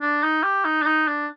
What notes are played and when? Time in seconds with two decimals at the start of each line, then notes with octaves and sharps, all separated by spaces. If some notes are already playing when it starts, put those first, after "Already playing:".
0.01 D4
0.23 D#4
0.43 G4
0.65 D#4
0.82 D4
0.86 D#4
1.08 D4